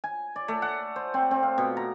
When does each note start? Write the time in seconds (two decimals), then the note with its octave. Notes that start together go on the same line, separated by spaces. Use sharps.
0.04 G#5
0.36 D5
0.48 A3
0.62 F#5
0.96 C5
1.14 C4
1.31 C4
1.43 F5
1.58 B2
1.77 A#5